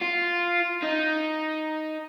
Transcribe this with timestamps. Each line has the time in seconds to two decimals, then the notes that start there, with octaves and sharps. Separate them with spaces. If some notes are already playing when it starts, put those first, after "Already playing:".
0.01 F4
0.83 D#4